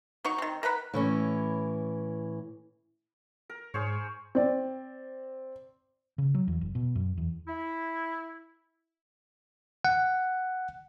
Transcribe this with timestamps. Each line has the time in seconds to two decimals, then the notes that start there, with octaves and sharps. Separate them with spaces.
0.25 F#3 D#4 C#6
0.38 D#3 C4
0.63 A#4 B4 F#5 B5
0.94 A2 E3 C#4
3.50 A#4
3.74 G#2 G#4 C5 C#5
4.35 C4 D5
6.18 C#3
6.35 F#3
6.48 E2
6.61 F#1
6.75 B2
6.95 F#2
7.18 E2
7.48 E4
9.85 F#5